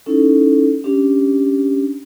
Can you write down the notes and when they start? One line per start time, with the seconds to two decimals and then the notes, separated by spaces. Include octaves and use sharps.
0.06 C#4 D#4 E4 A4
0.84 C#4 D4 G4